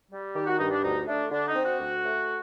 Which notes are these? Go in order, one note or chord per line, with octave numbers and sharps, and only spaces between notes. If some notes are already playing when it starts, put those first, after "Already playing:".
G3
D#3 G4
F#4
G2 D#4
D4
D2 D#4
A3 D4
D3 D4
D#4
C4
F#4
D2
A3